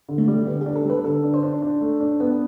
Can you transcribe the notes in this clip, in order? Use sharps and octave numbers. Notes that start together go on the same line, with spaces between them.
D3
A3
G3
D3 B3
D4 G4
A4
G3 B4
D3 A4
D4
C5
D4
D4
A3
D4
B3 B4